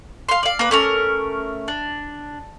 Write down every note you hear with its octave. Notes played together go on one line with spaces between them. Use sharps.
F5 C6
D5 F5
A#3 B4
A3 C#4 A#4
D4